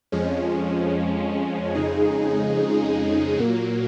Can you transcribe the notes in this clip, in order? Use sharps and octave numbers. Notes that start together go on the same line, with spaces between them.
F2 F3 G#3 C#4
F2 C#3 G#3 D#4 G#4
A#2 F#3 A#3